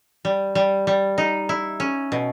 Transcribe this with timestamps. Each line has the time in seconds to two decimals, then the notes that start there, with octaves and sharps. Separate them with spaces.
0.25 G3
0.55 G3
0.87 G3
1.18 D#4
1.49 E4
1.80 C#4
2.12 B2